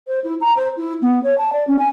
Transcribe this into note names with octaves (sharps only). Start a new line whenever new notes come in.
C5
E4
A#5
C5
E4
B3
C#5
A5
D5
C#4
G#5